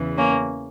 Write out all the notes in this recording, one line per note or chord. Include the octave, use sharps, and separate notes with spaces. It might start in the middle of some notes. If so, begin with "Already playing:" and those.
Already playing: E2 C#3 E3
A#3 C#4